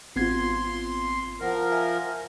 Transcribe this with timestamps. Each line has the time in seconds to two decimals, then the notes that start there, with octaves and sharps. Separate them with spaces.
0.16 G#1 B3 C4 F4 C6 G#6
1.41 F3 A#4 F#5
1.72 E5 G#5